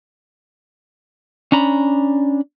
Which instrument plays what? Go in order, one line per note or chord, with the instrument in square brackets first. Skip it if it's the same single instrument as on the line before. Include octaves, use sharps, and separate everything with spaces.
[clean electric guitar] C#4 D4 A#5 B5